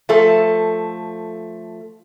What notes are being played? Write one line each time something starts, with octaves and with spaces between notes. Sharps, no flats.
F3 A3 A4